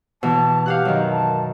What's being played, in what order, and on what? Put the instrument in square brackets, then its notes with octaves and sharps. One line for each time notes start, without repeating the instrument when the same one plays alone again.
[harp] B2 E3 [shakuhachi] A5
[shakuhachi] G4 [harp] F5 F#5 F#6
[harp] F#2 D#3
[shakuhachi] A5